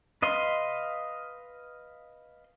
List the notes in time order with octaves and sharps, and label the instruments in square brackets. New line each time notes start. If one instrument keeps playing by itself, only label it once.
[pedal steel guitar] B4 D#5 F5 C6